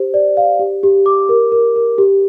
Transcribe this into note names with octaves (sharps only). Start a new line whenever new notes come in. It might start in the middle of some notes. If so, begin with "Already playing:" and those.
Already playing: G4 C5
D5
F5
G4
G4
D6
A#4
A#4
A#4
G4